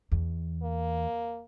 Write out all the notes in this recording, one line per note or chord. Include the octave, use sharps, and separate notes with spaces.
E2
A#3